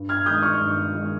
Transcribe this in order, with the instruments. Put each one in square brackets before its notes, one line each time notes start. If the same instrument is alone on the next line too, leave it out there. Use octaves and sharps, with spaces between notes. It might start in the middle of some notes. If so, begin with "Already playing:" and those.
Already playing: [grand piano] G2
F6 G#6
G#3 D#6 G6
D#3
C#6 F6
G2
D#3 G#3